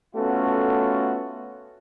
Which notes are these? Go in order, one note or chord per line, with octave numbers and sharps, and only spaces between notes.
A3 B3 C#4 F4 F#4 A4